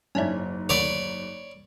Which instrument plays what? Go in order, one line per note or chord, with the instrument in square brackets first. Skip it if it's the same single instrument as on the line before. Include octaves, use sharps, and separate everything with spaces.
[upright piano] F#1 G#2 [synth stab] C#4 D4 E4
[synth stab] D2 D#3 [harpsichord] C#5 D5 B5